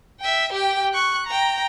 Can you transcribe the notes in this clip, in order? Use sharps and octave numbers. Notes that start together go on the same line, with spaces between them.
E5 G5
G4 G5
C#6 F#6
G5 A#5